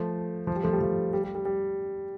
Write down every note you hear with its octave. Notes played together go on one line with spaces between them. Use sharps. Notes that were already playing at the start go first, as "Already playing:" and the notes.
Already playing: F3 A3
F3
G3
F3 A3
G3
F3
G3
G3
G3
G3